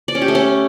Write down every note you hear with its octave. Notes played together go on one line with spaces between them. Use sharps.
D5
C#4
G4
A3
C#4